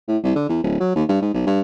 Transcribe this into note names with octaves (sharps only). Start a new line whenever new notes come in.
A2
C2
D3
E2
D1
F#3
D#2
G2
G#2
B1
G2